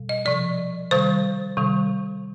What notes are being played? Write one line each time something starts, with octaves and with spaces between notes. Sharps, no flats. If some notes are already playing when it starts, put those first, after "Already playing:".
Already playing: B2 G3
D#5
C3 F3 D5
C3 D#3 G3 C5
C3 D#3 G3